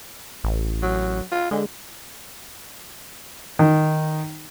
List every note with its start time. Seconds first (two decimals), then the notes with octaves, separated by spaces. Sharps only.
0.44 A1
0.82 F#3
1.32 F4
1.51 D3 G#3
3.59 D#3